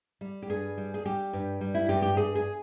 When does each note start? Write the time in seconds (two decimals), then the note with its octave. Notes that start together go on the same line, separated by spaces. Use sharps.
0.21 G3
0.42 G4
0.49 G2 G#4
0.78 G3
0.94 G#4
1.05 G3 G4
1.33 G2
1.61 G3
1.74 E4
1.89 G2 G4
2.02 G4
2.16 G2 G#4
2.35 G#4